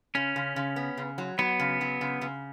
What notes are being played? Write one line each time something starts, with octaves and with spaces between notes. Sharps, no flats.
C#3 C#4
C#3
C#3
B3
C#3
F#3
F#3 B3
C#3
F#3
C#3
C#3